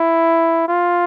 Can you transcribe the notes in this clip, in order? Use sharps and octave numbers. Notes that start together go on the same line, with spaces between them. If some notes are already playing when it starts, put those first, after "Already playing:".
Already playing: E4
F4